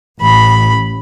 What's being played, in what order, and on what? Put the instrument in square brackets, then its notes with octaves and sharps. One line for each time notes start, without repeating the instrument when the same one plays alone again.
[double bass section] A1 [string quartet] B5